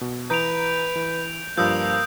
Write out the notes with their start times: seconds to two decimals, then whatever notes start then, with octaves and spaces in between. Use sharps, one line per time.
0.01 B2
0.30 E3 B4 A#5 D#6 G6 D7 F7
0.96 E3
1.57 G2 F3 A#3 D#6 E6 G6